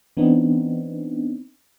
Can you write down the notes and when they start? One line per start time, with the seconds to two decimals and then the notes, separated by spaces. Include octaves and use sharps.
0.17 E3 B3 C4 D4 D#4